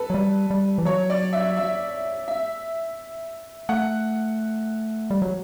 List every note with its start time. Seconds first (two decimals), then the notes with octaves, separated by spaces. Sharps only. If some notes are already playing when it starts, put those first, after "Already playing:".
Already playing: A4 B4
0.10 F#3
0.15 G3
0.50 G3
0.78 E3
0.85 F#3 C#5
1.10 D5
1.33 E5
1.57 E5
2.28 E5
3.69 A3 F#5
5.10 G3
5.22 F#3